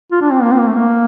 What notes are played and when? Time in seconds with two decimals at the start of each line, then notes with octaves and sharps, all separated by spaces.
0.12 F4
0.21 D4
0.32 C4
0.42 A#3
0.52 C4
0.59 A#3
0.68 A3
0.76 A#3